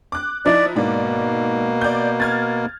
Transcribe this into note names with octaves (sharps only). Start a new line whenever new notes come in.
D6 F#6
F3 D#4 E4 D5
G#2 B2 A#3 D5
D5 G6
F6 G#6 A6